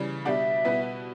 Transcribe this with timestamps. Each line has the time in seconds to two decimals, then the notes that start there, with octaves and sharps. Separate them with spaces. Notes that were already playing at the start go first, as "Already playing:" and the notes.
Already playing: C#3 E3 G3
0.25 B2 G3 D4 G4 D5 E5 F#5
0.65 B2 G3 B3 E4 B4